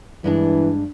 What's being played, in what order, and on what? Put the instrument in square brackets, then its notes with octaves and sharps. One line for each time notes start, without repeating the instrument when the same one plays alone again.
[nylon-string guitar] G2 G#3 D4 [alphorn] E3